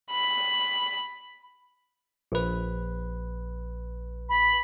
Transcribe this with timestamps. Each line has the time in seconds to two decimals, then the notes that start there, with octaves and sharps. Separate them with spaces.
0.11 B5
2.32 A#1 B4
4.29 B5